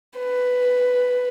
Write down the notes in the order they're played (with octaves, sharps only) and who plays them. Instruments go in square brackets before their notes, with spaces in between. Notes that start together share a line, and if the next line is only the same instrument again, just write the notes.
[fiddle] B4